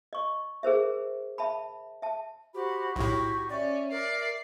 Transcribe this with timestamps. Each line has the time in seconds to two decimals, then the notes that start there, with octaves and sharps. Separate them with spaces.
0.13 D#5 C#6
0.63 G#4 A#4 C5 E5
1.38 E5 A5 B5
2.02 E5 A5
2.54 F#4 G4 C5 B5
2.96 B1 A2 E4 F#4 G4 C#6
3.50 C#4 D5 E5
3.91 A#4 D5 C7